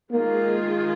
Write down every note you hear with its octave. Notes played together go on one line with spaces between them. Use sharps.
D#3 G#3 A#3 F4 G#4